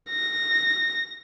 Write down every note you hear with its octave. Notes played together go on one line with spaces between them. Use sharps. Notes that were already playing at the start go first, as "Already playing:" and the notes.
A#6